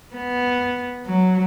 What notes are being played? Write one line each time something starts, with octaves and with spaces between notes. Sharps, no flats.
B3
F#3